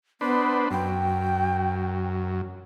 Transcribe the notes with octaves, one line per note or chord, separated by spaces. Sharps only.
B3 D4 B4 C5
F#2 G5